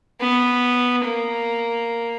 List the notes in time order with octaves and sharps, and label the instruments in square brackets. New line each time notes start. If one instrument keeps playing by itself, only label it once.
[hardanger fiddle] B3
A#3